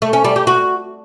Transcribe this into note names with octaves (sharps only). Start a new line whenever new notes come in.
A3
C#4
G3
G4
F#4